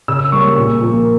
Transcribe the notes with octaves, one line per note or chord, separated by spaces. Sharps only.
C#3 E6
G3 A#3 C#4 C#6
A#2
F3 A#3